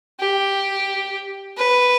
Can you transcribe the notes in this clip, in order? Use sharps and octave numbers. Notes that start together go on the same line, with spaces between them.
G4
B4